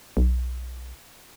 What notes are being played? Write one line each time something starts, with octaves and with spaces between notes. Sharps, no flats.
B1